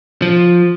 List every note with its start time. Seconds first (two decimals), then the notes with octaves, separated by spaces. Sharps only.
0.22 F3